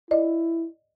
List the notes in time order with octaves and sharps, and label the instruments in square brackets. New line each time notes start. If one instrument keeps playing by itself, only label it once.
[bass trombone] E4 [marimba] D5 D#5